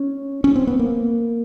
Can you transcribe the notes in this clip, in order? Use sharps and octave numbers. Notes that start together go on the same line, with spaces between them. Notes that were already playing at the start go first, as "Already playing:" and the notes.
Already playing: C#4
C#4
C4
B3
A#3